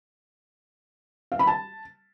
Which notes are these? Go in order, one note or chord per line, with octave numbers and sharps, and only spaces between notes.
F5
B5
A5